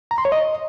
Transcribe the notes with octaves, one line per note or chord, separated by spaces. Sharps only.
A#5
C6
C#5
D#5